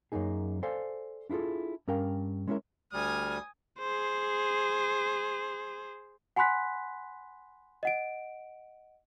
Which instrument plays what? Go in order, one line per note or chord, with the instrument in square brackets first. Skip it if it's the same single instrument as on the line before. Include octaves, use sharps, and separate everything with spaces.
[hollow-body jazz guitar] F#2 F#3 A#3 D#4 G#4
A4 C5 D5 F5 G#5
D4 E4 F4 G#4 A4
G2 C#4 A#4 F5 G5
G#3 C#4 E4 F#4 A#4 E5
[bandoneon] D2 G3 [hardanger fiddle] G#5 D#6 [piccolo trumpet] F6
[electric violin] G#4 C5
[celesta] F#5 G#5 B5 C6 F#6 B6
D#5 F#5 D7